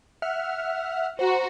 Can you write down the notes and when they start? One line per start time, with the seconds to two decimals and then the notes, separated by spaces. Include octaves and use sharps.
0.22 E5 F#5 F6
1.19 F#4 C5 A#5